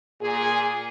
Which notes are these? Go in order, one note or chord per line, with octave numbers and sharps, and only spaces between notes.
A#2 G#4